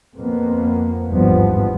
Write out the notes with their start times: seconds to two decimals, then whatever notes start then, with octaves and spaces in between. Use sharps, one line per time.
0.14 F2 A#3 B3
1.07 G#1 E2 G2 F3 B3